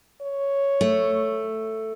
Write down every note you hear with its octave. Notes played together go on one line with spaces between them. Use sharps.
C#5
A3